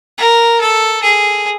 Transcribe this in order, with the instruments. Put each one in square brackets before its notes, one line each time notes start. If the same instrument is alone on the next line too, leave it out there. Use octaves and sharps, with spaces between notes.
[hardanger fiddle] A#4
A4
G#4